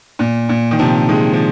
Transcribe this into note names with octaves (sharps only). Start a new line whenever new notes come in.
A#2
A#2
D#3
C3 F3
D#3 G#3
F3